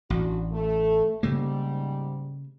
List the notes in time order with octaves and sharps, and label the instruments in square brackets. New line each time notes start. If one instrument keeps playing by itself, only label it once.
[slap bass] A1 [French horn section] D4 F#4
[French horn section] A3
[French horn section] G#2 G3 [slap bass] C#3 A3 A#3